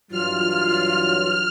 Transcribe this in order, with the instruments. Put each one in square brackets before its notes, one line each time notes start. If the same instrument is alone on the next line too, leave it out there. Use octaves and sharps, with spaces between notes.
[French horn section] G2 E3 F#3 [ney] F4 [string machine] F6